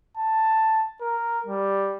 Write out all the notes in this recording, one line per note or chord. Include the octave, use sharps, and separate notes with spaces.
A5
A#4
G3